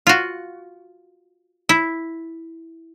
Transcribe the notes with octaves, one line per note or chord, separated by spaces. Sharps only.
F4 F#4
E4